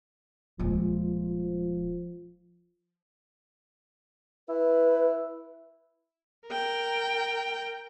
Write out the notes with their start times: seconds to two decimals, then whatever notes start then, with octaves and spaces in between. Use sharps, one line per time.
0.59 D#1 F3 G#3
4.49 E4 B4
6.47 A#4 G5